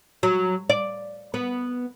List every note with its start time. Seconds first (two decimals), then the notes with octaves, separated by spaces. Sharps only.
0.23 F#3
0.70 D5
1.34 B3